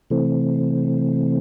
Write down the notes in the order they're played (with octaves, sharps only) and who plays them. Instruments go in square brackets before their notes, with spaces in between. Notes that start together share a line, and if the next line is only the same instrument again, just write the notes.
[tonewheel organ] C3 E3 A3 C4